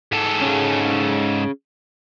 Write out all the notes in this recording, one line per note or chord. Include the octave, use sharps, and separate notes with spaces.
G#2 A4
C#4 G#4